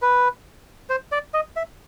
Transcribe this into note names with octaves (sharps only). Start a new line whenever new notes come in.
B4
C5
D5
D#5
E5